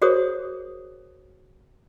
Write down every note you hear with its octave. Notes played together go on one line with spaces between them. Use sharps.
F#4 G#4 A#4 C5 C#5 D#6